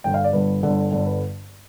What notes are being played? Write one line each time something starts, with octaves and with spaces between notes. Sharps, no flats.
G1 G2 D3 G5
F5
D5
G1 G2 D3 B4
G1 G2 D3
G1 G2 D3
B4